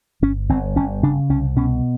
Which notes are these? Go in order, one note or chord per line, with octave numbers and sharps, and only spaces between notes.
G1 C#4
G1 C4
G1 C#4
C#3 D4
C2 C#4
B2 C#4